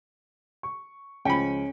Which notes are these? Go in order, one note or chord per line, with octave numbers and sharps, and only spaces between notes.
C#6
C#2 F3 C#4 G5 B5